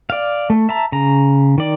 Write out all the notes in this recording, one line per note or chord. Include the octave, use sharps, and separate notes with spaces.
D5 F5
A3
E5 A5 A#5
C#3 A#5
D#3 D5